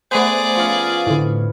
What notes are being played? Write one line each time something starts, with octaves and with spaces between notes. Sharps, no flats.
A3 B3 G#4 B4 C5 D5
F3 C#4 F4
A2 D3